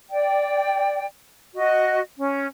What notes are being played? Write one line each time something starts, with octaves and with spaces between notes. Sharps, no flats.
D5 G5
F#4 D#5
C#4